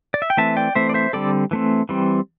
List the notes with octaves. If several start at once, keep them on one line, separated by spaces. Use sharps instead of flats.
D5
E5
G5
E3 A3 C4 E5 A5
D5 G5
E3 A3 C4 C5 E5
D5
C5 E5
D3 G3 C4 A4 D5
E3 A3 C4
E3 G3 C4